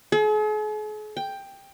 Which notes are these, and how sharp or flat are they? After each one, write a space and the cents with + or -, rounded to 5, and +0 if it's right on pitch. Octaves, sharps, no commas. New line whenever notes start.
G#4 +45
G5 +10